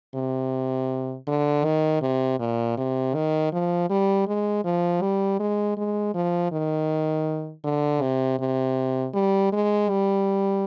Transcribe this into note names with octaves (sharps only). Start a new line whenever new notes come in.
C3
D3
D#3
C3
A#2
C3
D#3
F3
G3
G#3
F3
G3
G#3
G#3
F3
D#3
D3
C3
C3
G3
G#3
G3